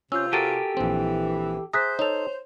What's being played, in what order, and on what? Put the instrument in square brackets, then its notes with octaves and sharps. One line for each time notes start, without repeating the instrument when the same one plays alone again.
[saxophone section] C3 F4 [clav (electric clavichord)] C#4 [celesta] E6 G6
[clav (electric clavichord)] F#4 A#4 [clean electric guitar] G4 A4 [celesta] A6 D7 D#7
[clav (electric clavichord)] A#1 C4 [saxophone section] E3
[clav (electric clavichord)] G#4 E5 A#5 [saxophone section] C5 [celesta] D#6 F#6 B6
[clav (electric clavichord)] D#4 A4 [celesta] C#5 F7